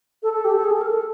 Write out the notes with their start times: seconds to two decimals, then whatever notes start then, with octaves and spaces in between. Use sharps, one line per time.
0.23 A4
0.33 A4
0.44 G4
0.56 A4
0.64 G#4
0.74 A4
0.81 A#4
0.90 A4